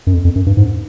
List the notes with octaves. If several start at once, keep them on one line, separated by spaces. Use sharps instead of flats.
F#2
F2
F2
F#2
G2
G#2